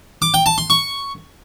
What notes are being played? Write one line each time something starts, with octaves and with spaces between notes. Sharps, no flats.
D6
G5
A5
C6
C#6